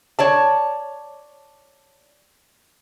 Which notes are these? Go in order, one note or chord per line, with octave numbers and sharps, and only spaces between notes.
C#5 D5 A5